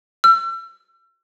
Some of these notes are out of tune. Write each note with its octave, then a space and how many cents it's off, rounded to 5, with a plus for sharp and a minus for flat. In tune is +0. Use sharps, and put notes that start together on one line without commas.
E6 +40